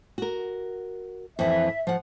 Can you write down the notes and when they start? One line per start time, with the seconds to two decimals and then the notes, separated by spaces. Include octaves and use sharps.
0.18 F#4 A#4
1.39 F2 E3 E5
1.87 F3 F#5